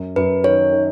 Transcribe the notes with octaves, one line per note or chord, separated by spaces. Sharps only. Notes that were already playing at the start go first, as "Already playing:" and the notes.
Already playing: F#2
F#2 B4
D#3 C#5
D#3